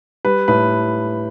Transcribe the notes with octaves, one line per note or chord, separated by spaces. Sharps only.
G3 B4
A2 B4